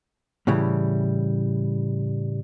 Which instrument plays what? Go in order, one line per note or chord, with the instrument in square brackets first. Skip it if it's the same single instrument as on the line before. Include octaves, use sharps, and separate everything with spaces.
[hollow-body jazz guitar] A2 C#3 E3 G3